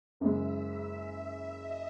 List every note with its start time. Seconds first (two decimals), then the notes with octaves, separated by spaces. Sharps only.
0.20 F#1 F#2 C#3 G#3 E5
1.10 E5
1.56 D#5